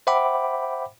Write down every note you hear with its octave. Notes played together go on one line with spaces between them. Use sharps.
C5 E5 F#5 G5 B5 D6